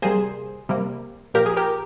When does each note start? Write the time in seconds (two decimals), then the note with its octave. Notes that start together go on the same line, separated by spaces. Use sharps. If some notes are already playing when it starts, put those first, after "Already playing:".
0.02 C3 G3 A#3 G#4 C5
0.69 C3 G3 A#3
1.34 A#2 F3 A#3 G4 A#4
1.46 G#4
1.57 G4 A#4